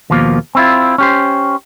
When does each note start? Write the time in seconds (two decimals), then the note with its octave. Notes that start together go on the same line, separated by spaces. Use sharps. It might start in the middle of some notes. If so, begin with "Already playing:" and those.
0.10 D#2 B2 F3 A#3
0.55 C4 E4 F4
0.98 C#4 G4 C5